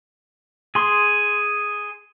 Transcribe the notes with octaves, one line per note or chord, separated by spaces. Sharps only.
G#4 C6